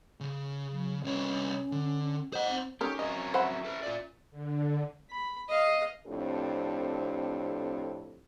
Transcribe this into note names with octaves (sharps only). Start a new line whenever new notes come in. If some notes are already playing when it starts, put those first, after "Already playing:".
C#3
F#3
C2 C#4 C#5
D3
C5 D#5 F#5
C4
D#3 A3 C#4 G4 A#4
F#3 C4 A#4 D#5
C5 E5 F#5 B5
A4 B4
F4 D5
D3
B5
D#5 F5
F2 A2 C4 D4 G4 A4